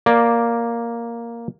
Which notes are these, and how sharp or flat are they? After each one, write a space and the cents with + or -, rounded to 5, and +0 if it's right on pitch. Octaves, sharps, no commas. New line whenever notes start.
A#3 +0 D5 +0